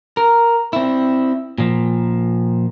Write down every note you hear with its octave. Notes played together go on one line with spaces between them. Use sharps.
A#4
C4 E4
A#2 F3